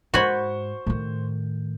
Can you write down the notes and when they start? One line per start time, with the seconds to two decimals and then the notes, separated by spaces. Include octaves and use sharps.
0.14 G#2 F#4 C5 G#5 B5 C#6 G6
0.87 A2 D#3